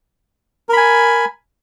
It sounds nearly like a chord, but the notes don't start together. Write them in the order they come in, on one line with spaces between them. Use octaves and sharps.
A#4 B5 G#5